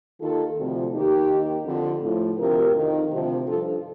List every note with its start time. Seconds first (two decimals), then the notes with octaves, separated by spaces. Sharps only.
0.21 D#2 D#3 F4 A4
0.57 D2 C3 F3
0.93 D#2 D#3 D#4 G4
1.30 D#2 D#3
1.66 F2 D3 F3
2.02 A2 F3
2.38 D2 C3 F3 G4 A#4
2.75 F2 D#3
3.10 D2 C3 F3
3.46 G2 F3 F4 A4